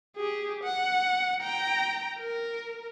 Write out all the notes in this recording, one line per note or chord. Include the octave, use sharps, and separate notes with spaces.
G4 G#4
F#5
G5 A#5
A#4